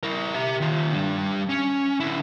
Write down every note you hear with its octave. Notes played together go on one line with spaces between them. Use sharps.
E4 A#4
G4 E5
D#3 F4
G3 D4
C#4
D3 E4